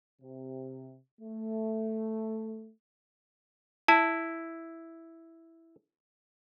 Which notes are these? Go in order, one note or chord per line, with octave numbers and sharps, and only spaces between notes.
C3
A3
E4 A5